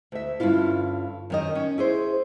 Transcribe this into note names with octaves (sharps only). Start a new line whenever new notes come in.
D2 E5
G2 D3 C#4 E4 F4
F#2 D#3 D#5
C#4
E4 G#4 C5